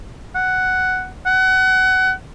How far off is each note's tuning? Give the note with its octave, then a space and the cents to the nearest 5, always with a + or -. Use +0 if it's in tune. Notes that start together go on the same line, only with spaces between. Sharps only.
F#5 +5
F#5 +25